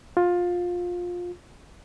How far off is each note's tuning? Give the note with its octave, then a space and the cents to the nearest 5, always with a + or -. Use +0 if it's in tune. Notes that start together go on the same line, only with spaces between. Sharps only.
F4 +20